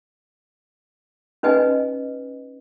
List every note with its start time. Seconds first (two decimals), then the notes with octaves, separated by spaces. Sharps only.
1.43 C#4 D#4 B4 D#5 G#5